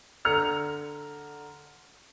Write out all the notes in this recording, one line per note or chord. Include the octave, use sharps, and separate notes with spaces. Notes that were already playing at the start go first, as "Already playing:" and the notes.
D3 A#5 F6 C#7 F7